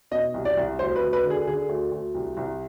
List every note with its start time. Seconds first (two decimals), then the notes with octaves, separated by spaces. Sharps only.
0.11 B2 D#5
0.34 C2
0.45 D5
0.57 C2
0.79 D2 C5
0.96 B4
1.02 D2
1.13 B4
1.24 D3
1.30 G#4
1.47 D3 G#4
1.69 D2
1.92 D2
2.15 C2
2.37 C2